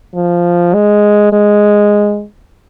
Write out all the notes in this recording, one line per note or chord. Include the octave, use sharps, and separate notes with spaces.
F3
G#3
G#3